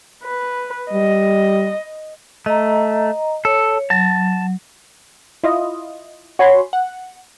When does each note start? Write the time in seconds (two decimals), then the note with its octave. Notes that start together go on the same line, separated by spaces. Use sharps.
0.24 B4
0.92 G3 D#5
2.46 A3 D#5 A#5
3.45 A4 C#5
3.90 F#3 A5
5.43 E4 F4 D#5
6.39 F#4 C#5 G#5 B5 C6
6.73 F#5